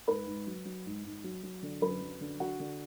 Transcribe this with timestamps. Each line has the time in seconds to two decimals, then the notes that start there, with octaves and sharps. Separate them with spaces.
0.07 G#2 B4 B5
0.27 G#2
0.47 F#3
0.65 F#3
0.86 G#2
1.04 G#2
1.24 F#3
1.43 F#3
1.63 D3
1.82 F#2 B4 B5
2.01 F#3
2.21 D3
2.40 D3 F#4 F#5
2.60 D3